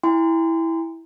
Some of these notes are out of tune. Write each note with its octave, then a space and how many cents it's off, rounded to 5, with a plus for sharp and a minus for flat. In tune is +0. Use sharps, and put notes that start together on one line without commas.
E4 -5 G5 +45 C6 -30